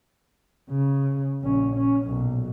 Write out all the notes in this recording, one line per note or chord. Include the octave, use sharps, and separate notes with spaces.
C#3
A#1 C#4
C#4
B1 A#2